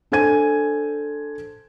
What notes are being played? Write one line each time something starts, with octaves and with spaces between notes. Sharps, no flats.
D4 A4 C5 G#5 G#6 D#7